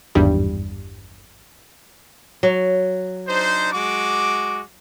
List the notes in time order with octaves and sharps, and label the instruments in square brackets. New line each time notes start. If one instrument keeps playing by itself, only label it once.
[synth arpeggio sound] G#1 E2 G2 G3
[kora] F#3
[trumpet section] D4 D#4 C5
G#3 F#4 D6